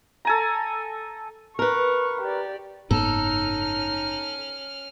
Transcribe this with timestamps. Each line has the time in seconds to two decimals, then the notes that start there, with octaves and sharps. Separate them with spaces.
0.25 A4 G#5 A#5
1.59 A#4 B4 C#6
2.22 G4 D5
2.91 F#1 G#2 B3 C#4 D#4 A4 F6